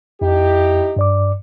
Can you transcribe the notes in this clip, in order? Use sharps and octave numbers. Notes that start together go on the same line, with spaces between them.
F2 D#4 E4 G4
G2 D5 D6